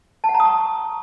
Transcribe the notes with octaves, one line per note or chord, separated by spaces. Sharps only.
A5
F#5
A#5
D#6
C#6